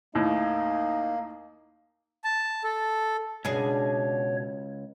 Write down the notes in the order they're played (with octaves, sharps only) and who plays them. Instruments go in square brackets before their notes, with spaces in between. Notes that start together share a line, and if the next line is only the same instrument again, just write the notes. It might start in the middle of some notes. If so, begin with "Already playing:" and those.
[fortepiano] D#2 A2 [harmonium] A#3 [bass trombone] D#4
[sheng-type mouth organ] A5
A4
[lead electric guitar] C#2 [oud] B2 D4 G#4 [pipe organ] C#5